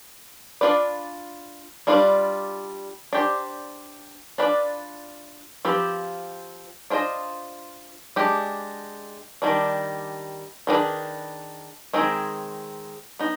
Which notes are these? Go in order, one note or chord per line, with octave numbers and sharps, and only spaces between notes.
D4 F4 B4 D5
G3 D4 F4 B4 D5
D4 G4 C5
D4 F4 B4 D5
F3 C4 G4 B4
D4 F4 C5 D#5
G#3 D4 G4
D#3 G3 D4
D#3 B3 D4 G#4 B4
D#3 G#3 C4 D#4 G#4
B3 D#4